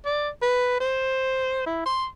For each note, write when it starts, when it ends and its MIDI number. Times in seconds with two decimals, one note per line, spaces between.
0.05 0.29 74
0.42 0.77 71
0.80 1.65 72
1.66 1.82 64
1.86 2.06 84